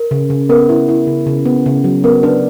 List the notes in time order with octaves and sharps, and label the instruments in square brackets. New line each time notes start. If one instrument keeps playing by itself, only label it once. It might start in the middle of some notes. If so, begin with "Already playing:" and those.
Already playing: [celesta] A#4
[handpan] C#3
C#3
[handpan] B3 [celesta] A#4
[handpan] E4
E4
C#3
C#3
B3
C#3
F#3
[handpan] B3 [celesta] A#4
[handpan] D4 [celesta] B4